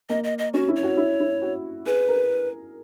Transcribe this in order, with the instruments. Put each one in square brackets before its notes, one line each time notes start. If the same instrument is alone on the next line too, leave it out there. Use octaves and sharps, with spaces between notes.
[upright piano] A#3 [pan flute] D#5
[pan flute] D#5
D#5
[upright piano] C#4 [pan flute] F#4
[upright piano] E4
[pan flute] C#5
[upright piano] F#4
E4
E4
F#4
[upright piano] G#4 [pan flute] B4
[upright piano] A#4